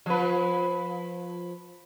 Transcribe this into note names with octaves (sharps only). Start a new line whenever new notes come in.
F3 B4